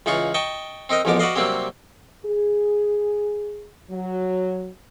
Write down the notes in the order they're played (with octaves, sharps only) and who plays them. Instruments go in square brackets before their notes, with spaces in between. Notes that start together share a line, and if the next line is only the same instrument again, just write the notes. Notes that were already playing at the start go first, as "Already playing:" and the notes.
[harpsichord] C#2 E3 D#4 F4 C#6
D#5 G5 A5 C#6
C4 D#4 A#4 D#5
A1 F2 G#2 B3 A#4 D6
F#4 B4 D5 D#5 F5
C3 F#3 G3 A#3 C4 G4
[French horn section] G#4
F#3